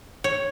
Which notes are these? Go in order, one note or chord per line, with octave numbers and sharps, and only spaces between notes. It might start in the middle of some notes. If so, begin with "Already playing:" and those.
C#5